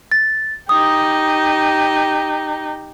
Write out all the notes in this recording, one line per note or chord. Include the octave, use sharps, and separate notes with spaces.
A6
D#4 G4 D#6